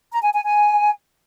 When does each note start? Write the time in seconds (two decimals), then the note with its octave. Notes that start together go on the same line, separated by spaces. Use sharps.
0.12 A#5
0.23 G#5
0.34 G#5
0.45 G#5